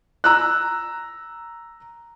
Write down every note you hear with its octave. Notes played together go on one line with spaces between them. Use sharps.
A#5 E6 F#6